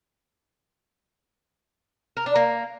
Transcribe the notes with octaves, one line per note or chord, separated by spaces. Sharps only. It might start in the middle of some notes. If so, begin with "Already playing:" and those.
A#4
D4
A#3